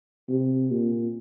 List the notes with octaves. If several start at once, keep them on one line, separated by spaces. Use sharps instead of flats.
C3
A#2